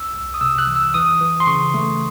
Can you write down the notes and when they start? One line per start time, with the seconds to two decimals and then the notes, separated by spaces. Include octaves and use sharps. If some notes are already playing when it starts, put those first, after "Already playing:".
Already playing: C2 E6
0.13 C2
0.34 D#6
0.41 C3 E6
0.58 F#6
0.67 E3
0.76 E6
0.94 E3 D#6
1.21 E3
1.40 C6
1.47 C#3 C#6
1.74 A3